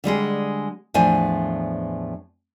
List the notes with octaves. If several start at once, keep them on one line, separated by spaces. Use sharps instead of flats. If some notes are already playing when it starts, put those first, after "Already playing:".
D3 G3 G#3 G#4
E2 A2 F3 D4 C5 G#5